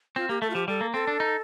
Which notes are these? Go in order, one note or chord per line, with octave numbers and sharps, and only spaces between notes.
C4 F4
A#3 G4
A3 A4
F4
F3 G4
G3 A4
A#3
C4 A4
D4
D#4